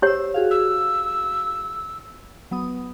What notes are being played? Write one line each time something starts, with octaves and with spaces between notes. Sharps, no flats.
G4 C5 C#5 E6
F#4 G#4 F5
E6
F#3 B3 D#6